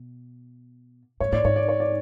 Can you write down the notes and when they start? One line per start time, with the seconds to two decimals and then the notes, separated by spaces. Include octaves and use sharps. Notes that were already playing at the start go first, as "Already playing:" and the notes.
Already playing: B2
1.20 G#2 C#5
1.32 A2 D5
1.44 G#2 C#5
1.56 D5
1.69 C#5
1.80 D5